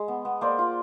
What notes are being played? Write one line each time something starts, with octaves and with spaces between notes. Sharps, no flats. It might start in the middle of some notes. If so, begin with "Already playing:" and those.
Already playing: G#3
B3
B3
A#3 C5 D5
F4